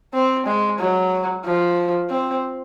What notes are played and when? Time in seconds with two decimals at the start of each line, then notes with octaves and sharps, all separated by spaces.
0.14 C4
0.46 G#3
0.79 F#3
1.45 F3
2.10 C4